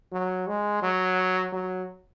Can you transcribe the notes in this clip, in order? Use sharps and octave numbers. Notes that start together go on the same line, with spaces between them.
F#3
G#3
F#3
F#3